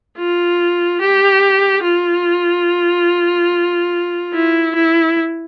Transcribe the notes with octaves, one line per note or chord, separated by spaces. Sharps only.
F4
G4
F4
E4
E4